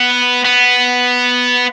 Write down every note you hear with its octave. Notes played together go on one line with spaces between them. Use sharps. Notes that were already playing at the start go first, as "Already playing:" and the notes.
Already playing: B3
B3